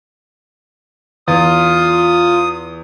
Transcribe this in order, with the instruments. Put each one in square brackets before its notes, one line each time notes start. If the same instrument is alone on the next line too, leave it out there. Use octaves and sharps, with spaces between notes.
[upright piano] E2 [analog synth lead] F4 [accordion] D#6